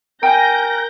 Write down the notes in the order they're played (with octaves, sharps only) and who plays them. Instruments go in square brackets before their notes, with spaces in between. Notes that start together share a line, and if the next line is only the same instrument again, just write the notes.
[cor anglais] A#4 [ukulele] G5 G#5 [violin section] G6 A#6